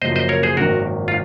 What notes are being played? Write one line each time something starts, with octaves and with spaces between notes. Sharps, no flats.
F#1 F#2 F3 C5 D#5
C5 D#5
A#4 C#5
G#4 C5
G#1 F#2 D#3 F#4 A#4
F4